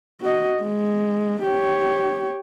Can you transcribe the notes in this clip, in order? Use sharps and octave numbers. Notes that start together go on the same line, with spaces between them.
F#4 D#5
G#3
G4 C#5